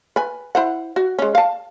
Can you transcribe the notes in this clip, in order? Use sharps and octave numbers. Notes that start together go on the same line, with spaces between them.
B4 G#5
E4 C5 F#5
F#4
G#3 C#4
F5 A5